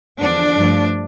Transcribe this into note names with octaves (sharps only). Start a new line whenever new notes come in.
E2 D3 F3 D4
G2 F3 A3